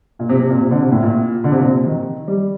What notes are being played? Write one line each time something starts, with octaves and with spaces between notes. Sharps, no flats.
A#2
C3
C3
A#2
C3
D3
C3
A2
A#2
D3
C3
A#2
C3
D#3
G3